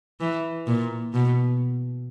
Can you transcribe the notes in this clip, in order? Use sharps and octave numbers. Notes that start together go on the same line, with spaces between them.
E3
A#2
B2